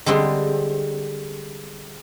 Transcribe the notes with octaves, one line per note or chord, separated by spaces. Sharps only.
D3 G3 G#3 C4